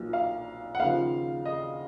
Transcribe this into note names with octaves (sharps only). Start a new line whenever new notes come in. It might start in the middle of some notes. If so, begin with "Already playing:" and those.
Already playing: B1 A#2 F3 A#3
F5
F#5
D#2 C#3 F3 F5
D#5